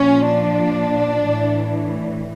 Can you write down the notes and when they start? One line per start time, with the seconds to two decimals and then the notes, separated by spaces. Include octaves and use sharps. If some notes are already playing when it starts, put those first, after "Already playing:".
Already playing: A#2 F3 C#4
0.25 D4
1.27 A2 E3